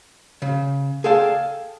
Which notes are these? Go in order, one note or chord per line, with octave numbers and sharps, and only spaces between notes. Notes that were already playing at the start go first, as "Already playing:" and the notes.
C#3
G#4 A4 D5 F5 G5 A5